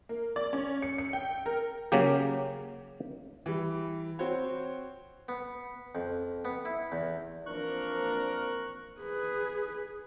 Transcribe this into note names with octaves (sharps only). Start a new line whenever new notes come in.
A#3
D5
C#4
C#7
C#7
G5
A#4
C#3 F#3 A#3 G4
E3 G3
C4 F#4 C5 C#5
B3
F2
B3
E4
E2
E3 F3 A#3 C4 D4 A#4 C#6 F#6
G#4 B4